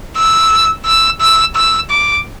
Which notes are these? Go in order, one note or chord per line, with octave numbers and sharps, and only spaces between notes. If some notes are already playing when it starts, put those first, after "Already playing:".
E6
E6
E6
E6
D6